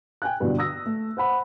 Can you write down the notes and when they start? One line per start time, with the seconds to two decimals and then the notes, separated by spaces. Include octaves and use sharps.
0.22 G5 G#5 F#6
0.40 G2 B2 D3 E3
0.59 D#6 E6 A#6
0.86 A3
1.17 C5 F#5 B5